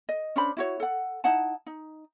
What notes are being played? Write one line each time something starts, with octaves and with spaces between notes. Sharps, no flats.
D#5
C#4 D4 C5 B5
E4 F#4 C#5
A4 F#5
D#4 E4 F#5 A5
D#4